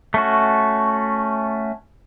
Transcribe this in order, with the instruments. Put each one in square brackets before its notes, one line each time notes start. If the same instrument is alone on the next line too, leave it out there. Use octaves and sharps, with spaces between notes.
[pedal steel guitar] A3 C#4 F#4